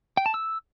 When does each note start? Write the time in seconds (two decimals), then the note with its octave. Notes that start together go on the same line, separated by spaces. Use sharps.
0.17 G5
0.26 A5
0.34 E6